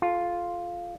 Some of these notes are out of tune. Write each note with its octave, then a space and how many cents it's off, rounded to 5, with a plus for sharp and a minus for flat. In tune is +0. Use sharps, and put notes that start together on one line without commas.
F4 +0 A4 -30